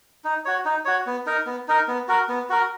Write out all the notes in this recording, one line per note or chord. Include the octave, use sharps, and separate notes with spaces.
D#4
F#4 C#5
D#4
F#4 C#5
B3
D#4 A#4
B3
D#4 A#4
B3
F#4 A#4
B3
F#4 A#4